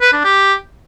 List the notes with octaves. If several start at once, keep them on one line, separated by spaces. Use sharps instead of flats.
B4
D4
G4